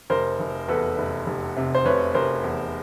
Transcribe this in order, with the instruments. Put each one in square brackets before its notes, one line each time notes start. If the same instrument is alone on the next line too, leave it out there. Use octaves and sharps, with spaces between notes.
[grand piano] F1 A#4 C5
F1
E2 A4 B4
F1
F1
C3
C5
F1 B4 C#5
F1 A#4 C5
E2